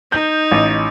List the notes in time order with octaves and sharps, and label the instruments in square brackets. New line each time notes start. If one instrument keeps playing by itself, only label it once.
[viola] D#4 [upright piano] G6
[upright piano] A1